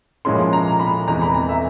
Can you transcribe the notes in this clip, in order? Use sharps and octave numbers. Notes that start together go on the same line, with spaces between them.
A#2 F3 G#3 C#4 E4 C6
A#5
B5
E2 C3 E3 G#3 A#5
B5
A#5
E5